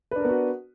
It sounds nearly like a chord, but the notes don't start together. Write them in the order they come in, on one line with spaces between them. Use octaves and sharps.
B4 D4 A#4 B3 F#4